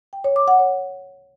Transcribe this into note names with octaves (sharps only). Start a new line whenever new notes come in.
G5
C#5
D6
F#5
C#5